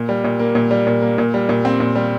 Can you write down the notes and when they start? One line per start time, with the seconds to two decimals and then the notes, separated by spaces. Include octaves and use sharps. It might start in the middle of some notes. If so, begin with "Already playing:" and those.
Already playing: A#2
0.09 G3
0.24 A#2
0.39 A#3
0.55 A#2
0.71 G3
0.87 A#2
1.02 A#3
1.18 A#2
1.34 G3
1.49 A#2
1.65 C4
1.80 A#2
1.95 G3